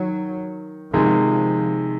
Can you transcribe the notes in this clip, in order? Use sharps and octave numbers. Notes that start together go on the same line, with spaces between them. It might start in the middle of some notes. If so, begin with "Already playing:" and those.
Already playing: D#3 F#3
C3 D#3 F3 G#3